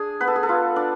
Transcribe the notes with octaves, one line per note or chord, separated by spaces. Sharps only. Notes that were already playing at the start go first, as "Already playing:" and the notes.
Already playing: D4 G#4
B3 B4
A4
G#4
A4
F4
D4